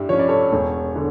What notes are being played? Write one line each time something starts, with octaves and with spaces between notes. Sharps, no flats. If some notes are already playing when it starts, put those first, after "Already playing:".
Already playing: G2 E4 G4
F3 C#4 C#5
D5
A4 C#5
E1
D3